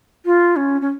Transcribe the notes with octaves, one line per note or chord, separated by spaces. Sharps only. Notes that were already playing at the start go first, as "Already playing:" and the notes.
F4
C#4
C#4